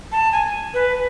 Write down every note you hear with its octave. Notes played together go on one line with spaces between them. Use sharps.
A5
G#5
B4